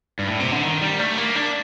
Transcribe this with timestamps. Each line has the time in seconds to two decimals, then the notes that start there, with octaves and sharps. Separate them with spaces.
0.19 G2
0.28 A2
0.40 C3
0.52 D3
0.63 D#3
0.81 G3
0.99 A3
1.18 A#3
1.36 D4